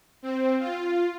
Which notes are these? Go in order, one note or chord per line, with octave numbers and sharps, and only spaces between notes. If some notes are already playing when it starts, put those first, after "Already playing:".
C4
F4